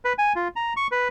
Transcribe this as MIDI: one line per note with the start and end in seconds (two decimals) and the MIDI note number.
0.05 0.13 71
0.18 0.33 80
0.36 0.48 65
0.56 0.73 82
0.77 0.87 85
0.91 1.08 71